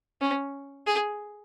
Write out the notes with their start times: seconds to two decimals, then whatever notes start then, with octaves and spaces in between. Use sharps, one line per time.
0.21 C#4
0.87 G#4